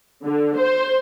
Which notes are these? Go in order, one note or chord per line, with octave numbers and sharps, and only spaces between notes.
D3
C5